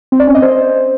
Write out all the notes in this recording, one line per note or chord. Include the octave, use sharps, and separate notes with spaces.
C4
D5
C#4
D#5
C5